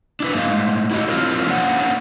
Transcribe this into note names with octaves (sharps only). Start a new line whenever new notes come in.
D4 E4 B4
G#2 A#3 E4 D#5 F5
A2 G#3
E4 F#4 G4 D#5
F3 C4 E4 F4 A#4 C5
A#3 C#4 D4 C5 D5 F#5